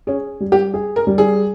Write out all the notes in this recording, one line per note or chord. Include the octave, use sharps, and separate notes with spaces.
C#4 G#4
G3
G4
G#4
A#4
G3
G#4